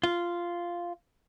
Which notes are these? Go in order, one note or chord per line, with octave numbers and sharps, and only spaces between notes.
F4